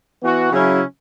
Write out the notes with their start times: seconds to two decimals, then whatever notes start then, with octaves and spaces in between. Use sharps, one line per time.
0.22 E3 B3 F#4
0.52 C#3 F#3 C#4 E4